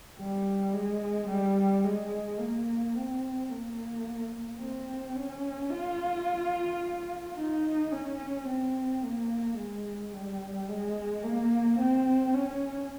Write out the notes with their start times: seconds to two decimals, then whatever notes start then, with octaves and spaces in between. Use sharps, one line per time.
0.18 G3
0.73 G#3
1.28 G3
1.84 G#3
2.39 A#3
2.94 C4
3.49 A#3
4.60 C4
5.15 C#4
5.70 F4
7.37 D#4
7.92 C#4
8.47 C4
9.02 A#3
9.57 G#3
10.13 G3
10.68 G#3
11.24 A#3
11.79 C4
12.34 C#4